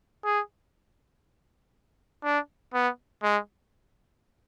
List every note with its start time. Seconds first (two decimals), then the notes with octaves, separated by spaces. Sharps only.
0.25 G#4
2.24 D4
2.74 B3
3.23 G#3